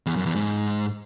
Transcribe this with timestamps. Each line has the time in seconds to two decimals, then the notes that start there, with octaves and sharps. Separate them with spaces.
0.06 E2
0.16 F#2
0.26 E2
0.35 G#2